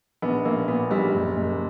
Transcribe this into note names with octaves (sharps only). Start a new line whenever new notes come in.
A#1 B3
A#1 A#3
A#2 B3
A#1 G3
F#1
F#1